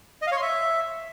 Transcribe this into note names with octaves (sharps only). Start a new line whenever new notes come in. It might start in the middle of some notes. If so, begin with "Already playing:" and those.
D#5
F5
C#5
C6
E5